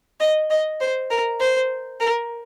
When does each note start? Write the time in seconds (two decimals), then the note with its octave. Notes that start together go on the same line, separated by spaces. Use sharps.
0.20 D#5
0.50 D#5
0.80 C5
1.10 A#4
1.40 C5
2.00 A#4